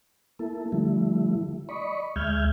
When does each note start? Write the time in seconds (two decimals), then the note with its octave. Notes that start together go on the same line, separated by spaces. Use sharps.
0.39 A#3 E4 A4
0.72 D3 F3 G3 A3 E4
1.69 D5 D#5 B5 C#6
2.16 D2 G#3 E5 F6 G6 G#6